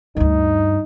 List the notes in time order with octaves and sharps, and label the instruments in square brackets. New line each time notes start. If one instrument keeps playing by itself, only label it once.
[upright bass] D2 G2 [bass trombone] D#4